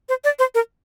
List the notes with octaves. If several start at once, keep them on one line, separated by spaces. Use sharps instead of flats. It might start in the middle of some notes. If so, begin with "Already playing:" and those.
C5
D5
C5
A#4